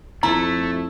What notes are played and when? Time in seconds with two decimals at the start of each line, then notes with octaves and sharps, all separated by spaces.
0.23 F2 A3 E4 A#5